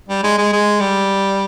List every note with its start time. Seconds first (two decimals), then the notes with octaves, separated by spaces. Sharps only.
0.09 G3
0.23 G#3
0.38 G#3
0.52 G#3
0.80 G3